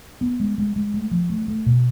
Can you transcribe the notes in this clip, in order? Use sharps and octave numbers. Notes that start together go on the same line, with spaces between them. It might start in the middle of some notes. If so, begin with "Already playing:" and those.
B3
G#3
G#3
G#3
A3
F3
A3
A3
B2